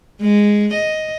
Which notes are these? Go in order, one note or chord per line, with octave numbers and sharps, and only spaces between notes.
G#3
D#5